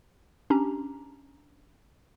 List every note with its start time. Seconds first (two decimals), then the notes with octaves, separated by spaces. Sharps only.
0.50 C#4 D4 G4 A#5